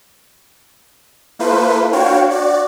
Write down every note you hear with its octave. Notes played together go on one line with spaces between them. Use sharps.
A#3 E4 F4 A4 B4 C5
D4 F#4 C#5 F5 G5
F#4 D5